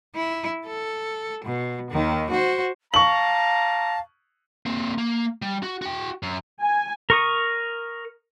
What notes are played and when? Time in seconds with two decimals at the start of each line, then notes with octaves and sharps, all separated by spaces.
0.15 E4
0.67 A4
1.45 B2
1.91 D#2 D#3
2.31 F#4 C5
2.94 G3 F5 A5 A#5 C#6 F#7
4.66 A#3 C4
4.98 A#3
5.42 G3
5.63 F#4
5.82 F#4 G5
6.23 F#2
6.62 G#5
7.10 A#4 C#6 D#6